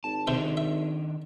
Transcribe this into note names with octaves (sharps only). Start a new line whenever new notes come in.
G#1 A5
C3 D#3 D4 C5 E5
E5